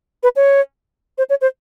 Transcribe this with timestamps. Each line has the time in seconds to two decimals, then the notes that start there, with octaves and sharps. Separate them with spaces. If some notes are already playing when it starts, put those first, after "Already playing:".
0.23 B4
0.36 C#5
1.18 C5
1.30 C#5
1.41 C5